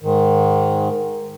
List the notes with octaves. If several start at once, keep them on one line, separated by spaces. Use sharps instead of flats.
G#2 D#3